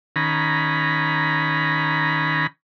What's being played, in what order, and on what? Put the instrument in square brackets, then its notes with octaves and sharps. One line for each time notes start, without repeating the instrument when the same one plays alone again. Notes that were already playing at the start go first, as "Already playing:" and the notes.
[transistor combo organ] D#3 C#4 A#5 B5